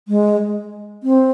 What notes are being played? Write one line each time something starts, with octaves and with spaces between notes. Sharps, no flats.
G#3
C4